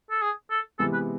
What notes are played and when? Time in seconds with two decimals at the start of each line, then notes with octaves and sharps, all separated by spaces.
0.11 A4
0.22 G#4
0.51 A4
0.79 C3 E3 G#3 B3 A4
0.93 B4